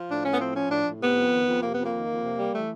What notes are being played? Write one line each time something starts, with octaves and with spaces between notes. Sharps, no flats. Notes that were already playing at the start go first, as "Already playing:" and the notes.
Already playing: F3
A2 D4
A2 C#4
B3
F3 C4
F3 C#4
A2 D4
A2
C3 B3
F2
D#3
F2
C3 A#3
F2 B3
A#3
D#3
F2
C3
G3
E3 A3